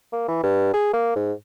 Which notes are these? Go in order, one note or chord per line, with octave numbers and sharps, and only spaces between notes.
A#3
E3
G2
G#4
A#3
G#2